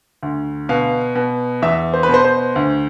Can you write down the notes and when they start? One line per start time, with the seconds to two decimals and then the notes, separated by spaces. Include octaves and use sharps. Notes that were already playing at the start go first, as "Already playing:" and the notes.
0.23 D2
0.69 B2 F5
1.15 B2
1.62 E2 E5
1.94 C5
2.03 B4
2.09 B2 C5
2.25 C5
2.56 D2